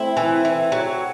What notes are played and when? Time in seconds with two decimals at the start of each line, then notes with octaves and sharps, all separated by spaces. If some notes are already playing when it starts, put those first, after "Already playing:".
Already playing: A3 C4 E4
0.17 E3
0.45 E3
0.72 F#3